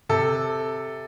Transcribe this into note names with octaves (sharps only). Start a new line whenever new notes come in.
C3 A4